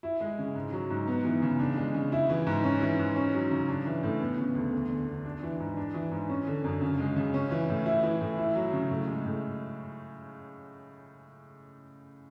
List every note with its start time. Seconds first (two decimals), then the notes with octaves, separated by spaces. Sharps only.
0.03 E4
0.21 G#3
0.38 C#3
0.55 G#2
0.72 F#3
0.90 G#2
1.07 B3
1.25 E3
1.42 C#3
1.60 D4
1.77 G#3
1.94 C#3
2.12 E4
2.30 E3
2.47 G#2
2.64 C#4
2.81 E3
2.99 G#2
3.16 C#4
3.34 F#3
3.51 C#3
3.69 D4
3.86 E3
4.03 A2
4.21 B3
4.38 C#3
4.55 D2
4.73 E2
4.90 D3
5.07 E2
5.25 D4
5.43 E3
5.60 G#2
5.77 D4
5.94 E3
6.11 G#2
6.29 C#4
6.47 D3
6.64 F#2
6.81 C#3
6.99 G#3
7.16 C#3
7.34 C#4
7.51 E3
7.69 A2
7.86 E4
8.03 E3
8.21 A2
8.38 E4
8.55 F#3
8.73 C#3
8.90 A2
9.07 G#3
9.25 A2